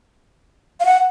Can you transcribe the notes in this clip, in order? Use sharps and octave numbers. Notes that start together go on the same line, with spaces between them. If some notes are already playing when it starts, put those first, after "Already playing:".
F5
F#5